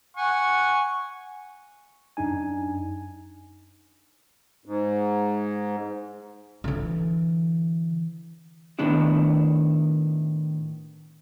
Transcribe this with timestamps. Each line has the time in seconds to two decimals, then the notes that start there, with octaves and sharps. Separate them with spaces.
0.17 F#5 G#5 C#6
2.17 F#2 D4 D#4 G#5
4.65 G#2
6.64 D3 E3
8.79 A2 D#3 B3 D4 E4